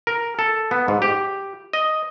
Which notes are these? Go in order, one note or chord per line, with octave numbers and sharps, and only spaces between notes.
A#4
A4
B3
G#2
G4
D#5